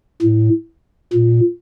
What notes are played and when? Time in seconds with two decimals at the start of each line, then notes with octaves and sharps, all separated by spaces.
0.22 A2
1.13 A#2